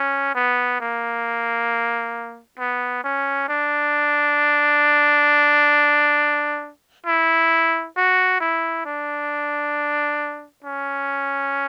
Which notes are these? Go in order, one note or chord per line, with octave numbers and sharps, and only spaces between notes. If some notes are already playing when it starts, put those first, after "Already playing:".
Already playing: C#4
B3
A#3
B3
C#4
D4
E4
F#4
E4
D4
C#4